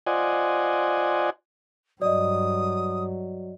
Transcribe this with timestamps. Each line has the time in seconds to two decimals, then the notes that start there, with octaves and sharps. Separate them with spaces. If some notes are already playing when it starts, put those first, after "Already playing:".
0.07 F4 C5 D5 D#5 F#5 G#5
2.02 G2 F#3 D5 D#5 D#6